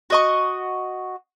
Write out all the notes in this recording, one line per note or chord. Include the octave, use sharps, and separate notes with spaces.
F#4 D#5 C#6